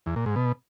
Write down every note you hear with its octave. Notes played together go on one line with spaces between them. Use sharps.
E2
A#2
G#2
B2